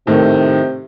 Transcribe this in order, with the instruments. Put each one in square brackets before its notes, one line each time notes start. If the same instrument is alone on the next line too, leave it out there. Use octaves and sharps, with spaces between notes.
[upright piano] A2 D#3 [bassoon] C3